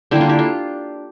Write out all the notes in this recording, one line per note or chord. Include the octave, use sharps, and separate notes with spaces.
D3 G3 A#3 E4 G4
D4 F4
E4 G4
F4 A4